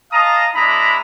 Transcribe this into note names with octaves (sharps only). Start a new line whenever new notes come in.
D#5 F5 A5 A#5 D#6
G#3 D4 E4 A#5 B5 D#6